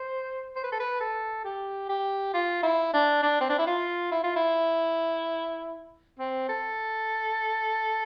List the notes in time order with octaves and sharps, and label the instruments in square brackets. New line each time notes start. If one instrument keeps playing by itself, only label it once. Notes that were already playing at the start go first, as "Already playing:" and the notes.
Already playing: [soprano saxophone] C5
C5
B4
A4
B4
A4
G4
G4
F4
E4
D4
D4
C4
D4
E4
F4
E4
F4
E4
C4
A4